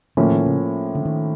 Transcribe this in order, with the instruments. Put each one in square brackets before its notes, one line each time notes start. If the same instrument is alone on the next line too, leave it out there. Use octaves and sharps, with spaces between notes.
[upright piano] A2 F3 A#3 C#4 [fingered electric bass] D3
[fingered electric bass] D#3
C#3
D3
D#3